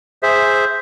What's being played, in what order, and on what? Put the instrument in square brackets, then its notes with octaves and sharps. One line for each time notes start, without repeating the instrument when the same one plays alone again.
[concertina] G#4 C5 E5